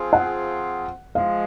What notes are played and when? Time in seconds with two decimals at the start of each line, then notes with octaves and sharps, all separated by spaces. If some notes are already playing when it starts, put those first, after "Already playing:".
Already playing: F3 C4 F4 G#4
0.13 F#5
1.15 F3 G#3 F5